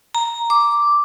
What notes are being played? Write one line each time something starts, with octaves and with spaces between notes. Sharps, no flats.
A#5
D6